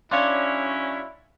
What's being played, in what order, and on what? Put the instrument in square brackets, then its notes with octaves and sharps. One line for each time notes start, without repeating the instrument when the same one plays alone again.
[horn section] F#3 C#4 [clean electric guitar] D4 C#5 [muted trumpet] E4 [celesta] D5 F5 C6